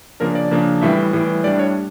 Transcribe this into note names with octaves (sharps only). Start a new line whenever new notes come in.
C#3 F3 A#3 D4 A#4
D5
C#3 F3 A#3 D4
A2 E3 G3 E5
A2 E3 G3
A2 G3 D4 D5
C#5